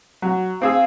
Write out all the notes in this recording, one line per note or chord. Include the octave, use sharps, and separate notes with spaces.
F#3
C4 G#4 F5 E6